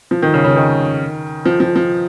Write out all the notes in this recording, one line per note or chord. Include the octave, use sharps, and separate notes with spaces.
F3
D#3
C#3
C#3
D#3
F3
F3
F3